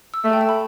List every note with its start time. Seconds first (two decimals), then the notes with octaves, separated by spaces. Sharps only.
0.14 E6
0.24 A3 E5
0.33 G5
0.41 A5
0.49 B5